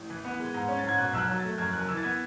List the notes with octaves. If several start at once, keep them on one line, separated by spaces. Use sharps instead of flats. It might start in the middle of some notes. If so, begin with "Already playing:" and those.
Already playing: A1
E3
B3
G#3
G#2
C#4
A6
G#2 G#6
B2 F#6
B1 E6
F#6
F#3
A6
A3
F#2 G#6
F#1 F#6
E3 E6
A6
B3 G#6